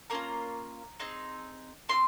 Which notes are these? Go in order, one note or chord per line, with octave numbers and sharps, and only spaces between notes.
A#3 C#4 F4 A#5
C4 D#4 G#4
C4 F4 C6